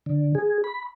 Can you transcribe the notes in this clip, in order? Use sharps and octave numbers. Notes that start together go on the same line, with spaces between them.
D3
G#4
B5